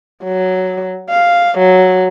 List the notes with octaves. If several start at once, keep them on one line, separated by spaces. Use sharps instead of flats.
F#3
F5
F#3